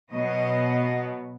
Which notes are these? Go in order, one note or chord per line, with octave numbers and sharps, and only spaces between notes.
B2 F#3 B3 D#5